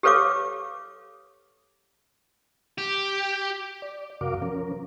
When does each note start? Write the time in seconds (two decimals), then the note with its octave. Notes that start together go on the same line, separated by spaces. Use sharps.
0.03 G4 A4 B4 C#5 F5 D6
2.78 G4
3.82 D5
4.21 F#2 C3 F#4 A#4 F5 D6
4.42 F3 C#4 A#4